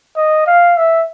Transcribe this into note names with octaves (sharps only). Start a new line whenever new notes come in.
D#5
F5
E5